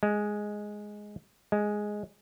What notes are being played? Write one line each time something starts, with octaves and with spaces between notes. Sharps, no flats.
G#3
G#3